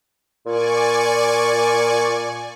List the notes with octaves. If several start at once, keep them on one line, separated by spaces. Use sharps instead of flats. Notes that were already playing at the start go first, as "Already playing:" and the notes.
A#2 D5 G#5 C#6